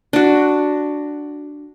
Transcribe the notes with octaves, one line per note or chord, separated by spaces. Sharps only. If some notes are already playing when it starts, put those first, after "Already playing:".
D4 F#4